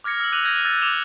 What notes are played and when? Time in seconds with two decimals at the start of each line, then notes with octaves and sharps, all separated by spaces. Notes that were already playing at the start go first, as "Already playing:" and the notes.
0.04 D6 F6 G#6 A#6 C#7
0.20 E6 F#7
0.32 D6 F#6 D#7 F7 F#7
0.45 F6 G6 G#6 A#6 D#7 F7
0.65 E6 F#6 A6 D#7
0.82 D6 E7 F7 G7